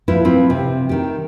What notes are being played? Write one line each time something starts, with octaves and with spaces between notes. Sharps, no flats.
F3 E4 B4
F3 C4 B4
C3
D#3 G4